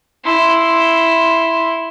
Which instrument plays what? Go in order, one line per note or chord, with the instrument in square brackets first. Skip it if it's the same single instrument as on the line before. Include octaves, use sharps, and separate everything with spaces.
[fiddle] E4 C6